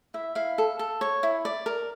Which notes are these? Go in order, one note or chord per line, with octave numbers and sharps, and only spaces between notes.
E4 E5
E4 F5
A4
A4
C#5
E4
D5
A#4